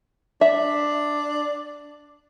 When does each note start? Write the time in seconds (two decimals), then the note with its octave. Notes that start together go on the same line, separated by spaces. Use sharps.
0.41 D4 E5